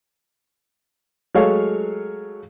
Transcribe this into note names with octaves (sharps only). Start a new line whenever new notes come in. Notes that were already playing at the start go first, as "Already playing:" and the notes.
F#3 G#3 A3 A4 C#5 F5